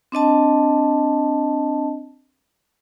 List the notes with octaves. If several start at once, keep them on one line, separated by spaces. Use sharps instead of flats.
C4 D4 D#5 A5